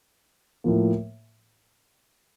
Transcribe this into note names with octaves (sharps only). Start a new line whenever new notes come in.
A2 F3 A#3